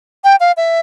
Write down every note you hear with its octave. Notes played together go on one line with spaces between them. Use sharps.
G5
F5
E5